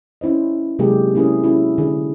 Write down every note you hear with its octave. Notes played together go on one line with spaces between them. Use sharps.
C#4 E4 C5 D#5
C3 F#3 G#3 A#3 G4 G#4
A#3 C#4 E4 G#4 A#4
C#4 E4 F#4
D3 G#4